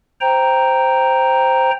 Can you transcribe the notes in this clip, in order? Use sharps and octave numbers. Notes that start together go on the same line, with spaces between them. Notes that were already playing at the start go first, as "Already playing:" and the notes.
C5 G5 A#5